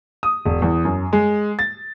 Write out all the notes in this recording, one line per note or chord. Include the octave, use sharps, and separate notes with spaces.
D#6
E1
E2
F#2
G#3
A6